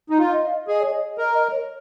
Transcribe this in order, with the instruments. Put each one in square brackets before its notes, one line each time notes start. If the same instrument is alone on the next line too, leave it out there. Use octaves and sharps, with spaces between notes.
[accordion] D#4
[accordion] F4 [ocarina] F5
[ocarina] D#5
F5
[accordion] G#4 [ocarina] D#5
[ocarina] C#5
D#5
[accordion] A#4 [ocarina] D#5
[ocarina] D#5
C#5